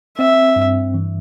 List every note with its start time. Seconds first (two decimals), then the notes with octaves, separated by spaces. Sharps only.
0.18 C4 E5
0.56 G2
0.94 E3